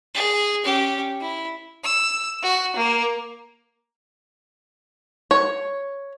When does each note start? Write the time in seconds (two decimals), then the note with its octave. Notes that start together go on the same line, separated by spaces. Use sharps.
0.14 G#4
0.64 C#4 G4
1.21 E4
1.83 E6
2.43 F#4
2.76 A#3
5.31 C#5